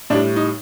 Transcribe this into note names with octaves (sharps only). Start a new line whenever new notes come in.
A2 G3 D4
D#4